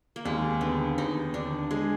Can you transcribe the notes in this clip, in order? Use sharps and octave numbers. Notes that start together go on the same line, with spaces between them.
A#3
D#2 G#3
D3 B3
D#2 D#4
D3 D4
G#3 G#4